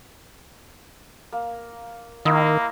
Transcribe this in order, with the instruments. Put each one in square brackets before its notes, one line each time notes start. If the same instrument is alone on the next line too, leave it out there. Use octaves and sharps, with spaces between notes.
[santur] A#3
[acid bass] D#3 [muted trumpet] A#3 [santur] E4 D#5